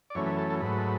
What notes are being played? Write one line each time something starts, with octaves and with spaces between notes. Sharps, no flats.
D5
F#2 E3 A3 C#4 C#5
B4
A4
A4
G#2 F#3 A3 B4